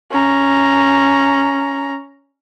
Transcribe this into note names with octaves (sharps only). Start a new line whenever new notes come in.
C#4 A#5